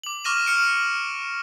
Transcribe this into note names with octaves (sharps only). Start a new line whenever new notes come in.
D6 F#7
C#6 D6 F6 A#6 D#7 E7
F6 C#7 D7